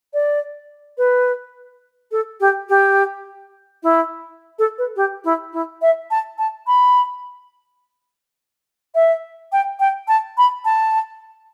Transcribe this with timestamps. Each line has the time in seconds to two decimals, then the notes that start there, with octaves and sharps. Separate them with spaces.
0.14 D5
0.98 B4
2.12 A4
2.40 G4
2.69 G4
3.83 E4
4.59 A4
4.78 B4
4.96 G4
5.25 E4
5.53 E4
5.82 E5
6.11 A5
6.38 A5
6.67 B5
8.95 E5
9.52 G5
9.80 G5
10.08 A5
10.38 B5
10.65 A5